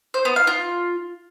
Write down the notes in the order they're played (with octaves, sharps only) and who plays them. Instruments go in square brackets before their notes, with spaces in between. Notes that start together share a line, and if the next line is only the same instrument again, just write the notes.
[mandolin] C5
B3
F5
F4